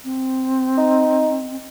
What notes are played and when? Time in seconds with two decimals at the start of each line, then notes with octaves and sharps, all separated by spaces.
0.04 C4
0.78 D#4